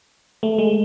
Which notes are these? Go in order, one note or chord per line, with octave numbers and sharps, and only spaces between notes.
A3
G#3